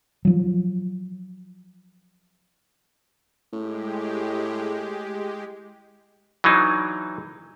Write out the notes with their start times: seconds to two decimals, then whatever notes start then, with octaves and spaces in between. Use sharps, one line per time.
0.25 F3 F#3
3.53 A2 G#3 G4
6.44 E3 F#3 D4 D#4